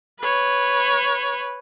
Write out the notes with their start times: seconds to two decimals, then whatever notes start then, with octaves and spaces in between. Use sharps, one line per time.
0.21 B4 C#5